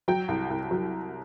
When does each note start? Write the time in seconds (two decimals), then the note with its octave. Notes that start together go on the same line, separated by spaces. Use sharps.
0.08 F#3 G5
0.28 C2
0.50 C2
0.71 F#3